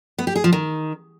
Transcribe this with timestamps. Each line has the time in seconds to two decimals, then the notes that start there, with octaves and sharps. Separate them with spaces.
0.18 B3
0.27 G4
0.36 G#4
0.44 F3
0.53 D#3